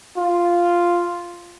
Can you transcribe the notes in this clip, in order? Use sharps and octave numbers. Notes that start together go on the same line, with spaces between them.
F4